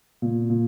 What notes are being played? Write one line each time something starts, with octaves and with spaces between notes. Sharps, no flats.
A#2
A#2